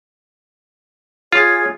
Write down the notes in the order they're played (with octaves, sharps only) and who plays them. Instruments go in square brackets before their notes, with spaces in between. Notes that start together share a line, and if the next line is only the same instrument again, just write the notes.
[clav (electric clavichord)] F4 [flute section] G#4 C#5